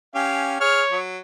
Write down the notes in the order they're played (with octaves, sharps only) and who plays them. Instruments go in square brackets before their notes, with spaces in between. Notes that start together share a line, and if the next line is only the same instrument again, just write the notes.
[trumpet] C#4 [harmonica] G4 F5 G#5
[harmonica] G#4 F6 [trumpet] C#5
[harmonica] F#3